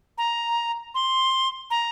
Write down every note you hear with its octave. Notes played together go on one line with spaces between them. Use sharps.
A#5
C6
A#5